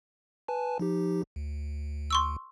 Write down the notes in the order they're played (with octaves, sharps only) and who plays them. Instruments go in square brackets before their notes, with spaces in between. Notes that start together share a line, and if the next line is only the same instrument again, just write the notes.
[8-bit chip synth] B4 G#5 A5
F3 D#4 G4
D2
[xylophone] C6 C#6 E6